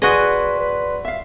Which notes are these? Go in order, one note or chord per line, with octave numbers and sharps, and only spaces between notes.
F#4 G#4 B4 D5 D#5 C6
B4
E5 F5